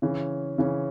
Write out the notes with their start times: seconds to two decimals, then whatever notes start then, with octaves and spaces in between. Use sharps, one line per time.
0.02 C#3 E3 C#4
0.58 C#3 E3 C#4